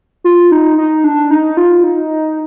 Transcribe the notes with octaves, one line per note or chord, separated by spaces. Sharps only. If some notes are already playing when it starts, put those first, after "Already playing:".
F4
D#4
D#4
D4
D#4
F4
D#4